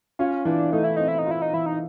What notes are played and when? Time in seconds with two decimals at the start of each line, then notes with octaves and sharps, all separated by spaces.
0.19 C#4 F4
0.45 E3 D4
0.72 A3 D#4
0.84 E4
0.96 C4 D#4
1.08 E4
1.19 D#4
1.27 E4 F4
1.42 D#4
1.53 E3 E4
1.66 D#4